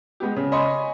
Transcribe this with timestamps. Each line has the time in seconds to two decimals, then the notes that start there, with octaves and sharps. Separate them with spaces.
0.20 G#3 B3 G4
0.36 C#3
0.52 C#5 D#5 G#5 B5 C6